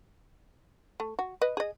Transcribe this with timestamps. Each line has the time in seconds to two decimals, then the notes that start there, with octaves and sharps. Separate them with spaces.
1.00 A3
1.19 F#4
1.42 B4 D#5
1.57 G#4 D#5